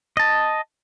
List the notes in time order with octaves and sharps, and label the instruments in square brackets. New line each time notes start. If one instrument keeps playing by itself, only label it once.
[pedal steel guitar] D#5 A5